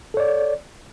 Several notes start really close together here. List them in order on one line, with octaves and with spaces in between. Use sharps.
A4 C#5 D5